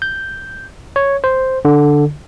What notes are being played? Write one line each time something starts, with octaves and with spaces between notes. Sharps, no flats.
G6
C#5
C5
D3